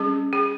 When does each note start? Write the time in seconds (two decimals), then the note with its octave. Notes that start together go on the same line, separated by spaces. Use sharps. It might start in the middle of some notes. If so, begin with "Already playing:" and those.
Already playing: G3 C#4 G#4
0.33 G#4